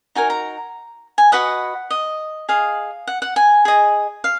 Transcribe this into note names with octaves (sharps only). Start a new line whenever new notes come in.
D#4 F#4 A#4 G#5
A#5
G#5
F#4 B4 D#5 F#5
D#5
G#4 D#5 F5
F#5
F#5
G#5
G#4 D#5
F5